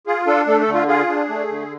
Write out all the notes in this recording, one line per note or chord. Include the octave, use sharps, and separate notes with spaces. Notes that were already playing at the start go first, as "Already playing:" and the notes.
F4 G#4
D4 A4
A3 A4
A4
D3
F4
F4 G#4
D4
A3
D3